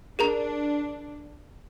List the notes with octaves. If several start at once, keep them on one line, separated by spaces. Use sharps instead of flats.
D4 G#4 A#4 A#5